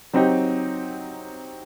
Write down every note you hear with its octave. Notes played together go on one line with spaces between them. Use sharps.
F#3 C4 D#4 G4